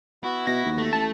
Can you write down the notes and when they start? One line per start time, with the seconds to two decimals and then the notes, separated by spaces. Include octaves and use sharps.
0.24 B3 E4 F#4
0.47 B2 E4 A#6
0.65 D#2
0.78 A3
0.93 A1 A5